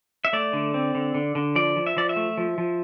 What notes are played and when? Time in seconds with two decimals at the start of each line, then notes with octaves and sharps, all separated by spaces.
0.25 E5
0.33 A3 D5
0.53 D3
0.74 C4
0.95 D3
1.15 D3
1.35 D3
1.56 F3 D5
1.76 F3
1.87 E5
1.97 F3 D5
2.09 E5
2.16 A3
2.37 F3
2.58 F3